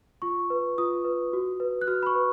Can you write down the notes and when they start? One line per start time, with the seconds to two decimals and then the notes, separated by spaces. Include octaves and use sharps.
0.22 F4 C#6
0.50 B4
0.78 F4 D#6
1.05 B4
1.33 F#4
1.60 B4
1.81 F#6
1.88 F#4 F6
2.03 B5
2.06 C#6
2.15 B4